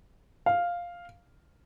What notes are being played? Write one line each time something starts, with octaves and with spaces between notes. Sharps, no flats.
F5